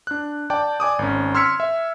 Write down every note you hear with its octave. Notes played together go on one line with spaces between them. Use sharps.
D4 F#6
D5 G5 A5 D6
D5 G#5 D6 D#6
G#1 C#4
C6 E6 F6 G#6 B6 C#7
E5